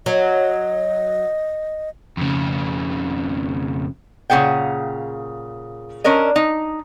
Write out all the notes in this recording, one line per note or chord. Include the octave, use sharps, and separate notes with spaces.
F#3 D#5
F2 C#3
A#2 C#3 G#4 F#5 G5
C#4 D4 A#4 D#5
D#4